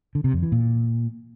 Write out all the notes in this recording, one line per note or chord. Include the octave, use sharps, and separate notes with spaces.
D3
C3
F2
E3
A#2